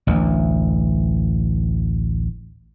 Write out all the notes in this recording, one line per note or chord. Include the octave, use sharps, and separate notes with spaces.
A1 D2